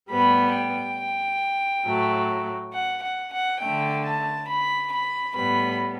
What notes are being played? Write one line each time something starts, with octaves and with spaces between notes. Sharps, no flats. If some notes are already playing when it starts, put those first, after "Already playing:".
A2 G3 B3 B5
G5
A2 F#3 A3
F#5
F#5
F#5
D3 A3 G5
A5
B5
B5
A2 G3 B3 B5